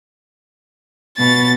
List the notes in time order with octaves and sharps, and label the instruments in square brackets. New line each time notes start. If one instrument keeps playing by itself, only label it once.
[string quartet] B2 [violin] A6